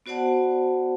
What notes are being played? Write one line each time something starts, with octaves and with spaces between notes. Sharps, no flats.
B3 F#4 C5 D5 F#5 A5